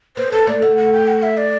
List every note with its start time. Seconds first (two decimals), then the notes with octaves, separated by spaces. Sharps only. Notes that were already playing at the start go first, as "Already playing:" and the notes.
0.17 B3 C5
0.32 B3 A4
0.47 A3 D5
0.62 A3 F#5
0.77 F#5
0.93 G5
1.08 F#5
1.23 E5
1.37 D5